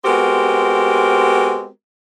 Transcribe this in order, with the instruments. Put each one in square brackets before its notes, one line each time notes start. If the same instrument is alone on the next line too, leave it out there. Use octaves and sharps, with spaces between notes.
[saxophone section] G#3 B3 C4 F#4 G4 A#4